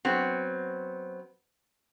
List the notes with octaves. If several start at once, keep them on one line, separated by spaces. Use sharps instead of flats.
F#3 B3 C4